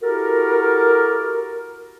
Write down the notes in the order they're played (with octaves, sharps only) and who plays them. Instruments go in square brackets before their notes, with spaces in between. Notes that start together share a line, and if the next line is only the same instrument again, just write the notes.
[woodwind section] E4 F#4 G4 A4 A#4